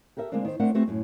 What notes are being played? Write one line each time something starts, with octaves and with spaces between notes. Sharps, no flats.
G4 A4 A#4 E5
D3 G#3 A#3 C4 D4
D#3 C5
A3 C4 D4 A#4 D5 F#5
A3 B3 C4 F#4 G#4
F#2 A2